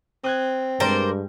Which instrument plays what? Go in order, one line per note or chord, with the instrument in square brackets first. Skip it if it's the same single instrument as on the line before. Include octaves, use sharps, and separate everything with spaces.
[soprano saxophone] C4 [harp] D#6 F#6 G#6
[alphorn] G2 [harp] G3 G#3 [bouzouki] A#4 C5 D5